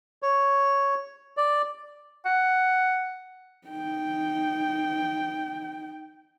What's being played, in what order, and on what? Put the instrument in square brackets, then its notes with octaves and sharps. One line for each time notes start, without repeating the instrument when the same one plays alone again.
[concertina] C#5
D5
[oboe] F#5
[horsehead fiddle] D#4 G5